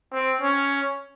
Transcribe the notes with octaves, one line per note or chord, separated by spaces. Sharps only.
C4
C#4